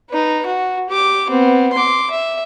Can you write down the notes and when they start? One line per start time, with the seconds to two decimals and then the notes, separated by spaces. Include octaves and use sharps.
0.10 D#4 B4
0.46 F#4
0.89 G4 D6
1.30 B3 C4
1.73 C6 D6
2.11 E5